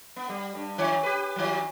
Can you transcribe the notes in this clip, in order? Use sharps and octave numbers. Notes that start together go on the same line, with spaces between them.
B3
G3
G2
D#3 C#5
G4 B4
D#3 F#3